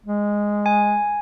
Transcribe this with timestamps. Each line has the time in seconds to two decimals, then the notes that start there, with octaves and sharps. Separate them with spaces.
0.07 G#3
0.66 G#5